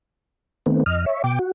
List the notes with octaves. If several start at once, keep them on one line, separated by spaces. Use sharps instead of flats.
D#3 A3 B3 C4
F2 D#5 F6
C#5 E5
B2 G5 D6
F#4